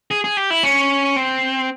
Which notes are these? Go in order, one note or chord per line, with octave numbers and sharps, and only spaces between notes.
G#4
G#4
G4
E4
C#4
C4